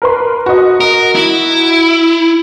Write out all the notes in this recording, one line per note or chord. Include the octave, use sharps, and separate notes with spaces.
A#4 B4 C6
F#4 D#5
A#4
E4